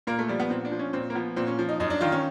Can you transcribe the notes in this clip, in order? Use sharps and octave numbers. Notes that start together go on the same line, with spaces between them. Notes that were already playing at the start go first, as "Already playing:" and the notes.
A#2 A#3
A3
F3 G3
B3
A#2 C4
D4
F3
C#4
A#2 C4
A#3
F3 B3
A#2 C4
C#4
F3
D#4
F#2 D#4
D4
D#3 F4
C#4